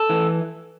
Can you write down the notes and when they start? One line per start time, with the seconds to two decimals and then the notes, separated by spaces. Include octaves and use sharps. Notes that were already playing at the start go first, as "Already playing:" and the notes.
Already playing: A4
0.10 E3